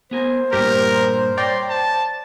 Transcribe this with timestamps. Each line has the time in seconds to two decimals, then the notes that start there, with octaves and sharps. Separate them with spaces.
0.11 B3 G#4 A#4 C5
0.53 G2 A#2 D4 G4 A#4
1.37 C#5 D5 G5 A#5 C6
1.70 A5